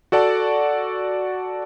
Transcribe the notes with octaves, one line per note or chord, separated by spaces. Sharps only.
F#4 A4 D5 F#5 A5